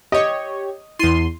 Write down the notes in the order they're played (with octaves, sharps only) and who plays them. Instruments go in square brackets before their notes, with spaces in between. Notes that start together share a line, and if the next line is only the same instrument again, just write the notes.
[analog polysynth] G4 C#5 [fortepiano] D#5
[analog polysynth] E2 C6 [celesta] E4 D#7